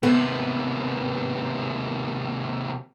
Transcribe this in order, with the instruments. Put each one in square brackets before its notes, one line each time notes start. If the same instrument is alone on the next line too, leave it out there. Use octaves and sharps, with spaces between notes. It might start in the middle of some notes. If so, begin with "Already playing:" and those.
[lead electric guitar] D#2 C3 [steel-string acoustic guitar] B3 B4